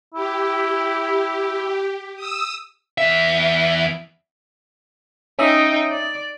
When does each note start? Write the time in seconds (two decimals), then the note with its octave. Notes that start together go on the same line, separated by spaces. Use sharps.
0.14 E4 G4
2.16 D#6 E6
2.98 E2 E5
5.39 C#4 D#4 E5 G5 D#6
5.91 D5